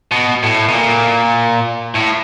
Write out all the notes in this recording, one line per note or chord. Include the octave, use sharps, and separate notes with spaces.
B2
A2
B2
A#2
A2